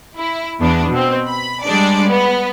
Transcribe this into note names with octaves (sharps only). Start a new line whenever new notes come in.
E4
E2 B3 D4
B2 C4
B5
G3 G#3 D4 D5
B3